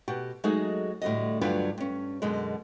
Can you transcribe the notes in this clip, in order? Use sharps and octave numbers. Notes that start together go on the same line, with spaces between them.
B2 F#4 G4
F#3 G#3 A3 D#4 F#4 G#4
A2 D3 G3 F#4 D#5
D2 G2 F#3 D4 F4 B4
G2 C#4
F#2 B2 D3 G#3